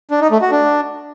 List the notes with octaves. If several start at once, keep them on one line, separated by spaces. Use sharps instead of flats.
D4
D#4
A3
F#4
D4